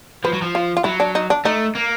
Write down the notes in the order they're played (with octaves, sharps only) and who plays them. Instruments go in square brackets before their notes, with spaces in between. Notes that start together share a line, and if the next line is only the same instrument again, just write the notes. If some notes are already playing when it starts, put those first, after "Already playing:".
[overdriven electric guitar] F3 [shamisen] B4
[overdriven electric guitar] F#3
F3
[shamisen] F4
F4
[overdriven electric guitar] F#3 [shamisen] E4
[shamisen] D4
D#4
D4
[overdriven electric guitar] A3 [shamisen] D#4
[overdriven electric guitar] A#3